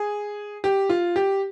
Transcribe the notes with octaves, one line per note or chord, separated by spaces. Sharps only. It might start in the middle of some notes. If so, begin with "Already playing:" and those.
Already playing: G#4
G4
F4
G4